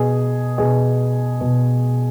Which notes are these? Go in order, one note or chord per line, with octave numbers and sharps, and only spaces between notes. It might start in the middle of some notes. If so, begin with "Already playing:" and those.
Already playing: B2 G#4
B2 G#4
B2